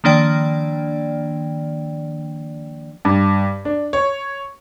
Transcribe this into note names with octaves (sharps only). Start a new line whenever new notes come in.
D#3 F3 A#3 D4 D5 G5
G2
D4
C#5